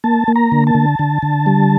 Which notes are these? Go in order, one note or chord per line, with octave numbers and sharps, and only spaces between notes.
A#3 A5
A#3
A#5
D3
A5
D3
D3
D3
G3